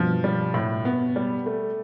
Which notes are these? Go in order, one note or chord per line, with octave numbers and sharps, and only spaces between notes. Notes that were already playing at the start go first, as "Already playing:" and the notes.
Already playing: G2 B2 F3
G3
A2
B3
G3
A3